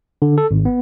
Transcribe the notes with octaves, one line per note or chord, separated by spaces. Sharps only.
D3
A4
G#1
B3